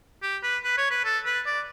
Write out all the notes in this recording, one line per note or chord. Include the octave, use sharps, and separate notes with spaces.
G4
B4
B4
C#5
B4
A4
B4
D5